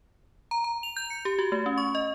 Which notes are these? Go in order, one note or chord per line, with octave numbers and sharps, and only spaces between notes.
A#5
A#5
F7
G6
C#7
G4
F#4
A3
C#4
C#6
D#5